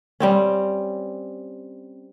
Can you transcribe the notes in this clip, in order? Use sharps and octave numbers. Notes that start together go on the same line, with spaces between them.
G3 C4 C#4